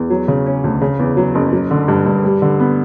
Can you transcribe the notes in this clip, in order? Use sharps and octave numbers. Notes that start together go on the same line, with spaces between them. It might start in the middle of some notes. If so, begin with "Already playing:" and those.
Already playing: E2
F#3
C#3
C#4
D2
C#3
E2
F#3
F#1
F#3
D3
G2
G2
G3
D3
B3